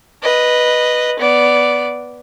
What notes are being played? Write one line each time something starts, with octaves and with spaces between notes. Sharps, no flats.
B4 D#5
B3 D5